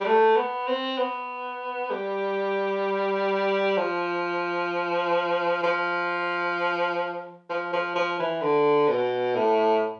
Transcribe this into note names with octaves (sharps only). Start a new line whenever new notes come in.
G3
A3
B3
C4
B3
G3
F3
F3
F3
F3
F3
E3
D3
B2
A2